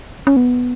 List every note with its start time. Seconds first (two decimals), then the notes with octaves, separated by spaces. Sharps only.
0.27 C#4
0.37 B3